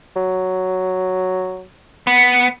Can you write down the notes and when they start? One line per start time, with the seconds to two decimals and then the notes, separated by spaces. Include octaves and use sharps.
0.16 F#3
2.07 B3